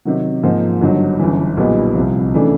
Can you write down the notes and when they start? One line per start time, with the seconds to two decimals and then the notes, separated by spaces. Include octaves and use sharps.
0.05 C3 D#3 F#3
0.43 G#2 F3 A#3
0.81 G1 G2 D#3 F#3
1.20 G1 F#2 C#3 E3
1.57 B1 A#2 G3 B3 D#4
1.95 C2 C3 F3
2.34 C#3 E3 A3 D4